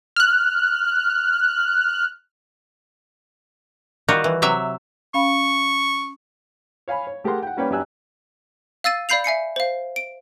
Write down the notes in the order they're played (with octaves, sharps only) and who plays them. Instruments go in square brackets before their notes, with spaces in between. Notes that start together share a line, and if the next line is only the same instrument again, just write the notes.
[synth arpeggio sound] F6 F#6
[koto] D#3 G3 F4 F#4
E3
C3 F#3 E5
[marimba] C#4 F5 B5 [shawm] C#6
[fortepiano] C#5 F5 G#5 B5
C#5
A3 G4 G#4 A#4 F#5 C6
F#5 G5
G3 A#3 C#4 B4 C#5 G5
F#2 D4 G4 G#5 E6 F#6
[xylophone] F5 E6 A6 D#7
D5 F5 B5 G6 C7 F7
E5 G#5 C7 C#7
C5 F5
D7